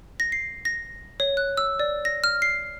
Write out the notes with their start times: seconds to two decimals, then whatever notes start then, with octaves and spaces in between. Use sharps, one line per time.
0.20 A#6
0.32 C7
0.65 A#6
1.20 C#5
1.37 F#6
1.57 E6
1.79 D5
2.05 A#6
2.24 F6
2.42 C7